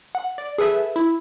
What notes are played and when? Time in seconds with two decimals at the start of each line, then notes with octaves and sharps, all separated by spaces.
0.15 F#5
0.38 D5
0.58 G#4 A4 B4 E5
0.96 E4